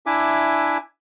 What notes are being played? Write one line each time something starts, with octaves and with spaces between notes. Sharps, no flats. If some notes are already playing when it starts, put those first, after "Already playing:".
D4 E4 E5 G#5 D6